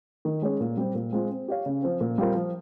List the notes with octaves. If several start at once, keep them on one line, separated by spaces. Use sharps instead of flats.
D#3
G#3 C#4 G#4 C#5
A#2
G3 C4 G4
A#2
G#3 C4 F4
C4
G4 C#5 F5
C#3
F3 C4
A#2
G3 C4 F4 A#4
F3